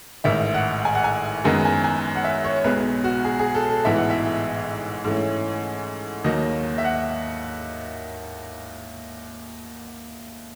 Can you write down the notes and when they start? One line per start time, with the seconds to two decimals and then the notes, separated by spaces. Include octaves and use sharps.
0.24 A1 G#2 D#3 E5
0.54 F#5
0.85 G#5
0.95 F#5
1.04 G#5
1.44 F#2 D#3 G#3 B3 D#4 G#5
1.65 G#5
1.84 G#5
2.16 F#5
2.24 E5
2.45 C#5
2.64 B1 B2 G#3 B4
3.04 F#4
3.25 G#4
3.39 G#4
3.55 A4
3.70 A4
3.85 A1 G#2 E3 B3 E5
3.97 F#5
4.10 E5
5.04 G#2 E3 A3 C#4
6.24 D#2 D#3 F#3 D#5
6.78 E5
6.84 F#5